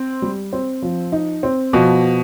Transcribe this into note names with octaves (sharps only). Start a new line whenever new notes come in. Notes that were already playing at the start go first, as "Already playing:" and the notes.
Already playing: C4
G3
C4
F3
D#4
C4
B2 F3